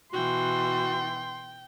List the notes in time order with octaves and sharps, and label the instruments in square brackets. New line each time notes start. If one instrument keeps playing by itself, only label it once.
[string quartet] B2 E3 [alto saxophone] F#4 [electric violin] G5 [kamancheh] C6